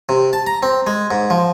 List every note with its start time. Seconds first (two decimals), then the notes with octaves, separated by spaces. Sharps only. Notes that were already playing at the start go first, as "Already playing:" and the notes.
0.09 C3
0.33 A5
0.47 A#5
0.63 C4
0.87 G#3
1.11 G#2
1.30 F3